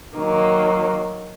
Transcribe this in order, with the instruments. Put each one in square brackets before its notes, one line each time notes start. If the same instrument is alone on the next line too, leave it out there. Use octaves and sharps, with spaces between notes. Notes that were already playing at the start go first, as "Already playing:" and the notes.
[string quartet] D#3 F#3 A#3